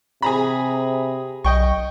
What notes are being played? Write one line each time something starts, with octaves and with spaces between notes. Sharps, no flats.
C3 G#4 A#5 B5
B1 D#5 G5 C#6